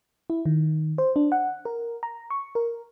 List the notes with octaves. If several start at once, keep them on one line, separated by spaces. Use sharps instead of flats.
E4
D#3
C5
D4
F#5
A#4
A#5
C#6
A#4